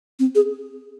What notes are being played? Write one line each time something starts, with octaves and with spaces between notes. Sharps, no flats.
C4
G#4